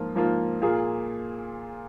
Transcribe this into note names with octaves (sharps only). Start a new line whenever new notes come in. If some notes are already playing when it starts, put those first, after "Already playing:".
Already playing: G#2 F3 A#3 F4
G#2 F3 A#3 F4
A#2 A#3 F4 G#4